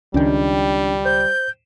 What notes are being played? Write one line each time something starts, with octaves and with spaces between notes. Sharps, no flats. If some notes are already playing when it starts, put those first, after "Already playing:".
C#2 D#3 G3 C#4 D4 G5
C5 G6